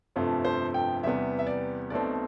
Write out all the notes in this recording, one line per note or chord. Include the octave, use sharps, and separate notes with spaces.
G1 F2 C3 F3 A3
C5
G5
E2 C3 G3 B3 E5
E5
D5
B1 B2 A3 C4 D5